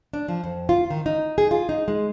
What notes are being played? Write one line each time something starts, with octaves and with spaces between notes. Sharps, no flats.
D4
F3
F2
F4
D#3
D#4
G#4
F4
D#4
G#3